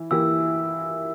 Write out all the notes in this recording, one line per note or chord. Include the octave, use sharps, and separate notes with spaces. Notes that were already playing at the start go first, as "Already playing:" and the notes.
Already playing: E3 E4
E3 A#3 E4 G4 E6